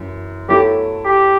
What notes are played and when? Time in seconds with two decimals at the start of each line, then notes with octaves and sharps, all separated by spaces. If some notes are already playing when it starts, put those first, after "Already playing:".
Already playing: F#2 E3
0.49 F#3 A3 E4 G4 A4
1.05 G4